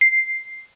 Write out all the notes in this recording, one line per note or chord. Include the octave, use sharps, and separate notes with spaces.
C7